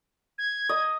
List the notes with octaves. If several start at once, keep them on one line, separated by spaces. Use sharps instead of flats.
G#6
D#5